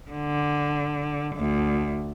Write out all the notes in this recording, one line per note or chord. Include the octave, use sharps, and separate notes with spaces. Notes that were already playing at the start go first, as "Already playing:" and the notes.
D3
D2